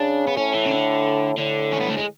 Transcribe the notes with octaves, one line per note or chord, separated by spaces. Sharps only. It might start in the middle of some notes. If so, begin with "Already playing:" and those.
Already playing: C#3 D4
B3
A2 C#4
E3
C#3
D3
A2 D3
C#4
B3
A3
G#3